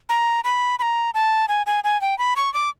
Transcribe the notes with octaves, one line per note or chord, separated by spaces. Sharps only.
A#5
B5
B5
A#5
A5
G#5
G#5
G#5
G5
B5
C#6
D6